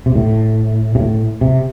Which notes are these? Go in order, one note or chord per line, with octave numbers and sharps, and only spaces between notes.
C3
A2
C3
A2
C3